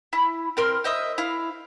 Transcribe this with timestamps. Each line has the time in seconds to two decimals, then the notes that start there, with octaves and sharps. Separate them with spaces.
0.13 E4 B5
0.57 C4 A#4 C6 F6
0.84 C5 D#5 E5 D#6
1.18 E4 F5